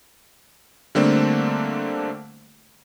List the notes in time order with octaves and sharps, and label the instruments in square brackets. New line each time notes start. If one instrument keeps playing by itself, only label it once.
[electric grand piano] D3 G3 A3 A#3 C4 D4